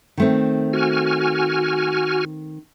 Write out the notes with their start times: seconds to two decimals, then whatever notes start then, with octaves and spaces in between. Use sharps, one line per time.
0.17 D#3 A3 C4
0.73 F#4 G#5 F6